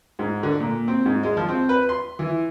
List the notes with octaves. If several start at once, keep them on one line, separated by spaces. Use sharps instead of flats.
G#2
D3
A#2
C4
G#2
G#3
F3
C4
B4
C6
E3